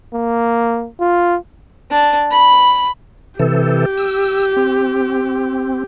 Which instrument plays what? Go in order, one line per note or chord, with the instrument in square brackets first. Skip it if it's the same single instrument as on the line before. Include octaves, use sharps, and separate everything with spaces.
[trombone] A#3
F4
[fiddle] D4
B5
[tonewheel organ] C3 E3 A4 [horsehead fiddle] G4
[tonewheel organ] E6
C4